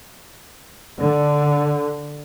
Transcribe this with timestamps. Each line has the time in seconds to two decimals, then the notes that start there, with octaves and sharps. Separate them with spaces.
0.99 D3